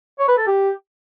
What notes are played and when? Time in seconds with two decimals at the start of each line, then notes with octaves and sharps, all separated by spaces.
0.19 C#5
0.28 B4
0.37 A4
0.47 G4